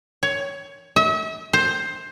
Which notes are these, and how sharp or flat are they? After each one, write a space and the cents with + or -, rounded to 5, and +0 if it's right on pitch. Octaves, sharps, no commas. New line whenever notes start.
C#5 +15
E5 -40
C5 +10